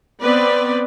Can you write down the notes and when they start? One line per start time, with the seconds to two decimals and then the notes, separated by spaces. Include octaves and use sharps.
0.21 B3 C4 B4 D5